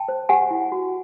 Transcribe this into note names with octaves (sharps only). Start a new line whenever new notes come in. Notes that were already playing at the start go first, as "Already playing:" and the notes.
Already playing: G5 A5
C5
G4 F#5 G#5
E4
F#4